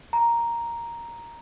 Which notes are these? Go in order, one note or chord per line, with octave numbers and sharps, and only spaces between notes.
A#5